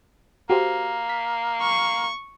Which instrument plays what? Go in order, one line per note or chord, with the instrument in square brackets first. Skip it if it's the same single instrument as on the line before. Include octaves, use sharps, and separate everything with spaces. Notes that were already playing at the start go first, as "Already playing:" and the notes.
[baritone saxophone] A#3 [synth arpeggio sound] F#4 G4 C5
[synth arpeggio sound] B6
[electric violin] C#6